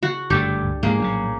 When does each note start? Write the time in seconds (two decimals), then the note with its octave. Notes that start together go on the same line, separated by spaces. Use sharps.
0.03 C#3 F#4
0.30 G1 F#2 A3 D4 G4 A4
0.64 C#2
0.83 G#2 F3 G#3 A#3 G#4
1.00 A#1 A2 C#3 F#3